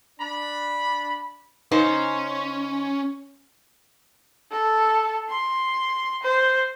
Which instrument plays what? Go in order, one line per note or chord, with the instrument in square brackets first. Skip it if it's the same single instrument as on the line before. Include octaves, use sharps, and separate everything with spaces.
[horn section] D4 B5
[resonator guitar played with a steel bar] C#3 D#4 C5 [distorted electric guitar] C#4
[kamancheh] A4
C6
C5